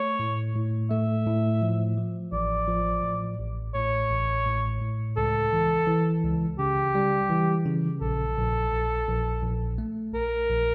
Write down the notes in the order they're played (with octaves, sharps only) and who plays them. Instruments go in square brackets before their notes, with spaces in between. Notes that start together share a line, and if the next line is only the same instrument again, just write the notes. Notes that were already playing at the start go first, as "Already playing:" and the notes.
Already playing: [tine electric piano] A3 [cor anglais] C#5
[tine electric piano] A2
A2
[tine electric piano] A3 [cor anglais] E5
[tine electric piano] A2
F3
F3
[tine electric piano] A1 [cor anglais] D5
[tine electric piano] F3
A2
A1
[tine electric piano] A2 [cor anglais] C#5
[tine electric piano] A1
A2
A2
[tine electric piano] C#2 [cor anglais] A4
[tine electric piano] E3
E3
C#2
[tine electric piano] C#3 [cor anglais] G4
[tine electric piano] G3
E3
C#3
[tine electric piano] A#1 [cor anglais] A4
[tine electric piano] A#1
A#1
A#1
A#1
A3
[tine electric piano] A#1 [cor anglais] A#4
[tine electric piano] A#1